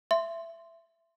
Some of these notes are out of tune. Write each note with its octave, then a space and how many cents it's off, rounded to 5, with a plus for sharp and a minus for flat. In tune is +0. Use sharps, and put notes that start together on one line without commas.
E5 +15 C6 +0